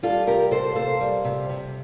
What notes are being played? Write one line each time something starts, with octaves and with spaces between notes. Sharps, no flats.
G3 F4 A4
C3 G4 A#4
C3 A4 C5
A#3 A4 C5
G3
C3
C3